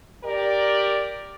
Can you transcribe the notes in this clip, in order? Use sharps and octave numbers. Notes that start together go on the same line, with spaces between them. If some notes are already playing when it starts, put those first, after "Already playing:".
G4 A#4 D5